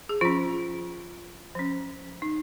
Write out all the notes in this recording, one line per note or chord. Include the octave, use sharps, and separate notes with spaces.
G#4
F3 C#4 F4
F3 C#4
D#4